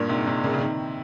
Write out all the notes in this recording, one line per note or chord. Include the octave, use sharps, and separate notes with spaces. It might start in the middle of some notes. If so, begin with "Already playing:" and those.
Already playing: G2 A#2
G#2 C3
G#2 C3
A#2 C#3
C#3
C3 D#3